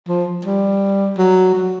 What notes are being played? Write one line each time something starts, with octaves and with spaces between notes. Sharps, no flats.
F3
G3
F#3
F#3